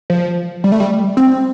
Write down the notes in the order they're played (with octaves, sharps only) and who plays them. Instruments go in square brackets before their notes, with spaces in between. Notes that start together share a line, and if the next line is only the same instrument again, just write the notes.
[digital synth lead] F3
G3
A3
G3
C4